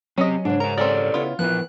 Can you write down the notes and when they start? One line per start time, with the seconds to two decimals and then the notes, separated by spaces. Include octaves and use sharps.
0.18 F#3 C4 C#4 G4 D#5
0.45 G#2 C#3 D4
0.60 A#4 C#5 A#5
0.78 C4 G4 A4 A#4 C#5 D5
1.14 C#3 B3 E4 F4
1.39 E3 F3 B3 E4 A#4 F#6